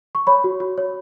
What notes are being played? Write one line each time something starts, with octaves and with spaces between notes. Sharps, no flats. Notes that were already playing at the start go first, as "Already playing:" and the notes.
C#6
C#5 B5
F#4
F#4
C#5